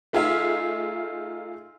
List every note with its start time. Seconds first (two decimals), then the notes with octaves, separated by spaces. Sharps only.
0.13 A3 D#4 F4 G#4 E5 F5